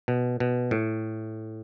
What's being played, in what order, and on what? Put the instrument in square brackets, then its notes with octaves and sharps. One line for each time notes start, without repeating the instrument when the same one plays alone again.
[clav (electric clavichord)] B2
B2
A2